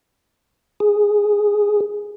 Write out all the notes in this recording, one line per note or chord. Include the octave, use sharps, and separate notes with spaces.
G#4